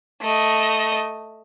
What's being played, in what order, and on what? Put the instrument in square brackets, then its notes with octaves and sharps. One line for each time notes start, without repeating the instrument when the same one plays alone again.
[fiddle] A3 D#5